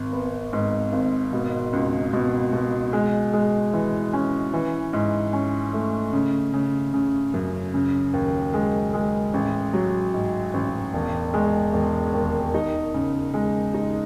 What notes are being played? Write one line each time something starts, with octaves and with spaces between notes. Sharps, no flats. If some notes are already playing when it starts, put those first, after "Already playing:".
Already playing: G#1
B3
G#2
G#1
B2
C#2
B2
B2
G#3
G#3
E3
C#4
E3
G#2
C#4
A3
C#3
C#3
C#3
F#2
C#3
D#2
G#3
G#3
A1
F#3
G#2
A1
E1
G#3
E1
D#2
D#4
C#3
G#3
D#4